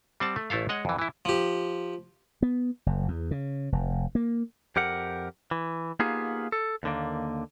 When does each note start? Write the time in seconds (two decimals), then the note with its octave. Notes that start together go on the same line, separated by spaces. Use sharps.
0.20 G3 C4 F#5 A5
0.36 A3
0.50 A1 A3 E4 A4 F5
0.69 G#3 C#5 D#5 F#5
0.85 F2 E3
0.99 E3 E4
1.25 F3 G4
2.42 B3
2.86 F#1
3.08 E2
3.31 C#3
3.72 F1
4.15 A#3
4.76 F2 G4 A#4 F#5
5.51 E3
6.00 A#3 B3 D#4 F4 G4 G#4
6.52 A4
6.83 D#2 D3 A#3